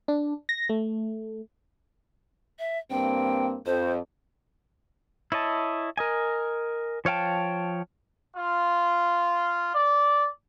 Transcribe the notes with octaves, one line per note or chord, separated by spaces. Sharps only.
D4
A#6
A3
E5
G2 A#3 C4 G5
F2 C5
E4 C#5 D#5 A5
A#4 D#5 G#5
F3 C#5 F5 G5 A5
F4
D5